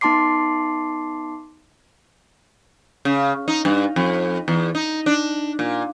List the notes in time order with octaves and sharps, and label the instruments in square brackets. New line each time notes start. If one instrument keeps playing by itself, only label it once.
[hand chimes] B3 D#4 A5 C6 D6 C7
[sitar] C#3
D#4
G2
F2
E2
D#4
D4
A#2